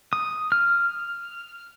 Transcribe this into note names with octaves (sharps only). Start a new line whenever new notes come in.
D#6
F6